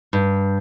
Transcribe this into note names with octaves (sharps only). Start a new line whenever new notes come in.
G2